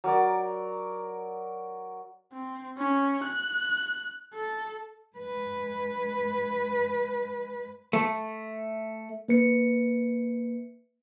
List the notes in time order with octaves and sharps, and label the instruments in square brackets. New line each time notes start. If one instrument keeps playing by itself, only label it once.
[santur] F#3 A#4 D5
[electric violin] C4
C#4
F#6
A4
[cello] G#3 B4
[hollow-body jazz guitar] A3
[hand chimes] A#3 B4 C#7